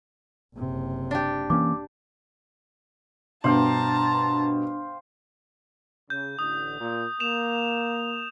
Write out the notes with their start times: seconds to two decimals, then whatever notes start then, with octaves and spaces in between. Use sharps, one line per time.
0.56 F#1 C3
1.11 D4 G4
1.50 E3 A#3 C#4 D6
3.44 G2 B2 D4 C5 F5 G5 A5 A#5
6.10 C#3 G6
6.39 A1 D3 D#6
6.80 A#2
7.20 A#3 E7 F7